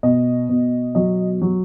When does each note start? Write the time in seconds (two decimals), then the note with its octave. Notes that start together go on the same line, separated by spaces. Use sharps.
0.03 B2 D#5
0.49 B2
0.95 F#3 D#5
1.42 F#3